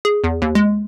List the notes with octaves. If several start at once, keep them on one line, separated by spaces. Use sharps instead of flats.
G#4
E2
D#2
G#3